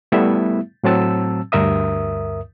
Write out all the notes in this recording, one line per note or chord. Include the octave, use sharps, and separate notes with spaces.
G3 A3 B3 E4 E5
A2 F#3 C4 A5 E6
D2 G2 A#4 E5 D#6